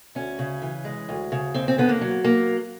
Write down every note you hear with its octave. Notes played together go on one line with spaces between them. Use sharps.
D2 C#4
C#3
E3
G#3
D2
C#3
D#2 C4
C4
D3 B3
A#3
F#3
A#3